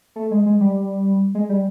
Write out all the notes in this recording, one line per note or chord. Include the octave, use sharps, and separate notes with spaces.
A3
G#3
G#3
G3
G#3
G3